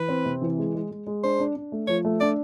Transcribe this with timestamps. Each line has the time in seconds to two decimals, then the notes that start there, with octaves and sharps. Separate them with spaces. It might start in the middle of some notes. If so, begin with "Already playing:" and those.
Already playing: E3 B4
0.09 C4
0.25 C3
0.42 E3
0.58 G#3
0.75 G#3
0.91 G#3
1.07 G#3
1.23 D4 C5
1.40 D4
1.56 D4
1.72 A3
1.88 F3 C#5
2.05 A3
2.20 D4 D5